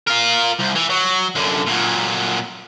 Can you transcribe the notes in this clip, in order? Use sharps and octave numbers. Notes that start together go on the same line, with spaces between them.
F4 A#4
C2
E3
F#3
F#2 D3
A#2 F#3